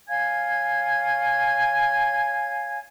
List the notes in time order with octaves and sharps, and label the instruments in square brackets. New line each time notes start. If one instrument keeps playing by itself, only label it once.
[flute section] C#5 F5 G#5 G#6